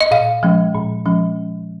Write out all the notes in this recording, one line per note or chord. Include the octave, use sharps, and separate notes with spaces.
D#5
A#2 F5
F3 G#3 C#4
A#2
F3 G#3 C#4